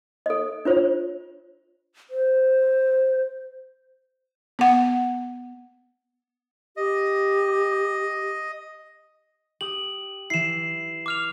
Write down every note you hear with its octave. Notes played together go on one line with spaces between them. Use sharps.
A4 D#5
D4 F4 C5 C#5
C5
B3 F#5
G4 D#5
G4 D#6 F#7
E3 E4 C7 E7
D6 F6 F7